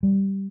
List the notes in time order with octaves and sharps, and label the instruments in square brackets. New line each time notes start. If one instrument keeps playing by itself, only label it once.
[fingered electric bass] G3